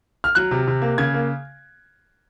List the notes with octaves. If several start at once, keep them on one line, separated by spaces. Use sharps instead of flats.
F6
F#3 F#6
C3
C3
A#3
C#3 G#6
A#3